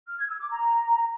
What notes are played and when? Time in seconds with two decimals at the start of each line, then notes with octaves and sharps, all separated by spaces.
0.07 F6
0.18 G#6
0.29 E6
0.39 D6
0.50 A#5